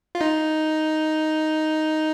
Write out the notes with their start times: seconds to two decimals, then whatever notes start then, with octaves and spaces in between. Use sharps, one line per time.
0.15 F4
0.21 D#4